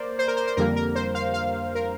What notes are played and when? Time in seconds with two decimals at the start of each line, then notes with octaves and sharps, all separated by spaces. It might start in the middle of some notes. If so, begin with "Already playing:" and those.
Already playing: A#3 A#4 C5 D5
0.19 C5
0.28 A#4
0.37 C5
0.47 C5
0.57 F2 D3 G3 A#3 A#4
0.76 A#4
0.95 C5
1.15 F5
1.34 F5
1.75 A#4